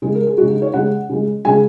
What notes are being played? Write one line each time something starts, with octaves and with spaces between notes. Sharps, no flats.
C#3 G#3 G#4
A#4
G#4
C#3 G#3 F#4
D#4
C#5
C#3 G#3 F#5
C#3 G#3
C#3 G#3 G#5